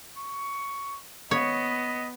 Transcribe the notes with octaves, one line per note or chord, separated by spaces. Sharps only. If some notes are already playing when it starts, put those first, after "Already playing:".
C#6
B3 C#5 D#5